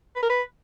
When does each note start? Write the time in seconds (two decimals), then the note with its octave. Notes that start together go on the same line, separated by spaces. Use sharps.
0.16 B4
0.22 A#4
0.29 B4